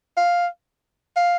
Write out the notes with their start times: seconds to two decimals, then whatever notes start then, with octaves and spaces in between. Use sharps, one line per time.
0.17 F5
1.17 F5